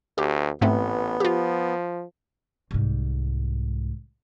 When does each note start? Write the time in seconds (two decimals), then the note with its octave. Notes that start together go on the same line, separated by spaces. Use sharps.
0.18 D2 G4
0.61 A1 G#2 A3 B3 C4
1.20 F3 F4 G4
2.71 C2 G#2